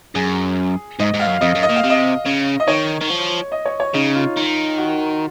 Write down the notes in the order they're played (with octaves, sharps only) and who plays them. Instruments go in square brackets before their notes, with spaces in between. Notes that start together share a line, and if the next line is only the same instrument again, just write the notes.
[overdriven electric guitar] F#2 [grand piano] G#4
[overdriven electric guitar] G#2 [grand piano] D#5
[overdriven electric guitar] G#2
[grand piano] F5
[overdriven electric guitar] F#2
[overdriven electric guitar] F2 [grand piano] D#5
[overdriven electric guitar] F#2
[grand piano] D#5
[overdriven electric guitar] A#2
[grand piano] F5
[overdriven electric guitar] C3
[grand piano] D#5
[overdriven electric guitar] C#3
[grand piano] D#5
[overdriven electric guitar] D#3 [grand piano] C#5
[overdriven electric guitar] D#3
F3
[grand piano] D#5
C#5
C#5
[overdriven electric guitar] C#3 [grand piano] D#4
[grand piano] F4
[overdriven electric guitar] D#3
[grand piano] F#4